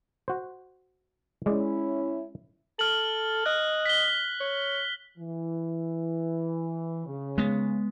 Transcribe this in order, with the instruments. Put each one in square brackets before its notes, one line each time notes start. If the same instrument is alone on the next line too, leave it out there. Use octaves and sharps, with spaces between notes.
[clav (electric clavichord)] F#4 C5
[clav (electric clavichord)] G#3 D5 [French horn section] C#4 E4
[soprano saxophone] A4 [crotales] F6 F#7
[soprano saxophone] D#5 [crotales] F#6
[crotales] B6 G7
[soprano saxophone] C#5
[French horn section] E3
C#3
[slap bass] G#3 B3